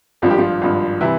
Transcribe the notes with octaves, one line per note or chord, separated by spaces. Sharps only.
G#1 G2 F3 F4
G4
F3 F4
G#1 G2 F3
C3 E3 G3 E4